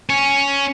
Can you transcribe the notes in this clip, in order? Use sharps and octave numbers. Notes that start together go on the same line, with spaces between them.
C#4